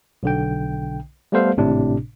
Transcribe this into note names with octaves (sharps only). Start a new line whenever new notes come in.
B1 D3 G5
G3 A3 B3 A4 C5 F5
G#1 A2 C3 D4